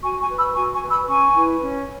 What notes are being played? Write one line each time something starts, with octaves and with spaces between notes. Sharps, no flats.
F#4 G#5 C#6
G#5 C#6
B4
B5 E6
F#4 G#5 C#6
G#5 C#6
B4
B5 E6
C#4 G#5 C#6
E4 B4
C#4